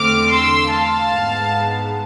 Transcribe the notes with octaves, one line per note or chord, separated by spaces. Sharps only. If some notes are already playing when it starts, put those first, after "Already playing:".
Already playing: E2 D3 A3 C4 D6 F6
C6 E6
F5 A5
G#2 G#3 B3